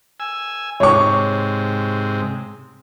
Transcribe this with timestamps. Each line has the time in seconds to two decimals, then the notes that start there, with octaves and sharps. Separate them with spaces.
0.20 G#5 E6
0.80 G#2 C3 C#5 C#6